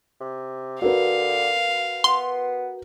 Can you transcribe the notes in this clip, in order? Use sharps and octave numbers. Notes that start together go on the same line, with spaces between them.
C3
D3 F#4 A#4 B4 F5
B3 C6